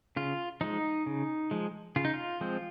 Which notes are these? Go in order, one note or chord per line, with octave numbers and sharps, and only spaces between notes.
C#3 F4
F3 G#3 D#4
C#3
F3 G#3
C#3 F4
D#4
F4
F3 G#3 C4